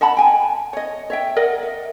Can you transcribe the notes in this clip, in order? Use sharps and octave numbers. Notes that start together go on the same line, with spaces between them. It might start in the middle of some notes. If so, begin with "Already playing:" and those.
D#5 F#5 A5 B5
G5 G#5
C#5 D#5
C#5 E5 G5
A#4 D5 D#5 F#5
E5